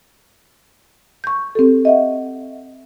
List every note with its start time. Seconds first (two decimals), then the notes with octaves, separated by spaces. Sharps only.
1.24 C#6 G6
1.55 C4 G4 A4
1.85 D#5 E5 F#5